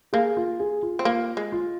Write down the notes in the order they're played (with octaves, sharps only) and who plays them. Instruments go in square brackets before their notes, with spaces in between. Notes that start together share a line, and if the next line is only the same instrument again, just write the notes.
[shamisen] A#3 [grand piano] G#4
[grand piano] F4
G#4
F4
[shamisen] C4
[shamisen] A#3 [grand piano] F4
[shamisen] G#3
[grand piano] F4